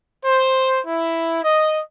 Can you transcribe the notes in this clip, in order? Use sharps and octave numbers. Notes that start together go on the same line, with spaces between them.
C5
E4
D#5